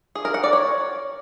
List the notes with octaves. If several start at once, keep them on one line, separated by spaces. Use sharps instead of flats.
G#4
A#4
F#5
D5
C#5